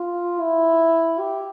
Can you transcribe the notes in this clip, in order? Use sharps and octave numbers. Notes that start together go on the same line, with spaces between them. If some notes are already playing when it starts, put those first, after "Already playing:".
Already playing: F4
E4
G4